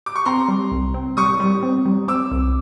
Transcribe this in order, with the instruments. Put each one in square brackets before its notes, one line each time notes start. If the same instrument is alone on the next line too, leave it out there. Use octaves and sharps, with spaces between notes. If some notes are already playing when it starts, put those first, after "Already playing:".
[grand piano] D6
C#6
[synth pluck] C4 [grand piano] A#5 C6
[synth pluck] G3
C2
C4
[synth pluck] G3 [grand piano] C#6 D#6
[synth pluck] G3
C4
G3
[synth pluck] C4 [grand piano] D6 E6
[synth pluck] C2